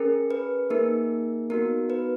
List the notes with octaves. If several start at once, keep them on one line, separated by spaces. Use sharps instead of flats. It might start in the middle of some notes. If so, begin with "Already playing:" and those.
Already playing: C#4 G#4 A#4
B4
A#3 D#4 G#4 A#4
B3 D#4 F#4 A#4
B4